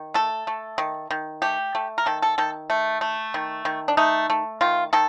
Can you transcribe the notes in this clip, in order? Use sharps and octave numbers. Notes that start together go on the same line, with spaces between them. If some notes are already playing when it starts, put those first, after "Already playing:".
Already playing: D#3
A3 A4
A3
D#3
D#3
A3 G4
A3
A#4
D#3 A4
A4
D#3 A4
A3
A3
D#3
D#3
D4
A3 D#4
A3
D#3 F4
D#3 A4